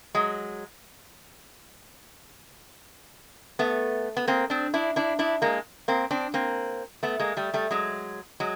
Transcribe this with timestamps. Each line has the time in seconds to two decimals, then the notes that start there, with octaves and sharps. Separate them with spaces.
0.15 F#3 G#3
3.59 A3 B3
4.17 B3
4.28 A#3 C4
4.50 C4 D4
4.74 D4 E4
4.96 D4 E4
5.19 D4 E4
5.42 G#3 A#3
5.88 A#3 C4
6.11 C4 D4
6.34 A#3 C4
7.03 A3 B3
7.20 G#3 A#3
7.37 G3 A3
7.54 G3 A3
7.71 F#3 G#3
8.40 F#3 G#3